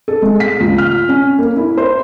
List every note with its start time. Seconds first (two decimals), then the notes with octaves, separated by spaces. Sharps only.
0.08 A4
0.22 G#3
0.40 B6
0.60 C#2
0.78 F6
1.09 C#4
1.39 A#3
1.57 E4
1.78 C5